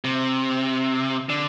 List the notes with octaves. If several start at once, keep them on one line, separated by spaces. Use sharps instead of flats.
C3
D3